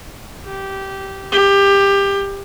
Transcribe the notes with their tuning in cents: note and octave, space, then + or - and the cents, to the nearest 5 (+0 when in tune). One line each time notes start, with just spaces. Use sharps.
G4 -15
G4 +20